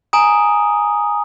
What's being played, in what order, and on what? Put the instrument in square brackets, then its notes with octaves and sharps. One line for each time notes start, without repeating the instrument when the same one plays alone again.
[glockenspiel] G#5 A#5 D#6